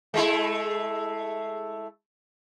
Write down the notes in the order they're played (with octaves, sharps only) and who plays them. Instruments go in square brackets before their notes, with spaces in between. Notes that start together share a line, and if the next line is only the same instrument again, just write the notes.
[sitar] G#3 A3 E4